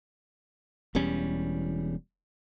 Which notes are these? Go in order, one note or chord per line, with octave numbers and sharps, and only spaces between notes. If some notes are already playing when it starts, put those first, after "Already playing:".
E1 E2 G3 C#4